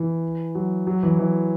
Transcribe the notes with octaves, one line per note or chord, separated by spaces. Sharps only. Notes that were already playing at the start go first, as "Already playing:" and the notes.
Already playing: E3
F#3
F#3
E3
E3